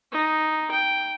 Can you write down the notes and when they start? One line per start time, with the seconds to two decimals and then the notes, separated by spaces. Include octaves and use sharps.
0.12 D#4
0.71 G5